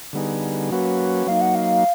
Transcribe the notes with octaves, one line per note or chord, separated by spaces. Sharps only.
D3 G3 B3 D#4 G#4
F#3 A#3 C#4 F#4 B4
F#3 A#3 D#4 F5
F#5
F5